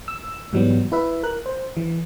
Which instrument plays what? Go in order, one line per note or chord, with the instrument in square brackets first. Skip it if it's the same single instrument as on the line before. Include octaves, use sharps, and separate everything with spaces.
[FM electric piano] E6
G#2 E3 F#3 G3 B3
E4 B4 E5
A#4 F#6
C5
E3